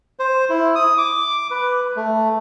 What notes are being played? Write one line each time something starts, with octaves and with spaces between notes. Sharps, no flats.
C5
E4
D#6
D6
B4
A3